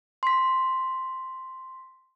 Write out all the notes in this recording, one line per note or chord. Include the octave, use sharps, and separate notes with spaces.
C6 B6